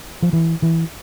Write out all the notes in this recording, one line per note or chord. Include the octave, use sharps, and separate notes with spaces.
F3
E3
E3